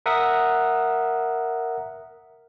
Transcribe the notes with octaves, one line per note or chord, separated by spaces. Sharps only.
A#4 E5 F#5 D#6